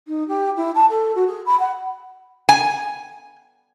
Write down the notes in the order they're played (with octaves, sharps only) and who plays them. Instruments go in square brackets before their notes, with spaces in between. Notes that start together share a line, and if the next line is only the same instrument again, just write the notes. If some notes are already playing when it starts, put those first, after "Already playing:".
[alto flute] D#4
G4
E4
A5
A4
F#4
G#4
B5
F#5
[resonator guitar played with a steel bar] G#5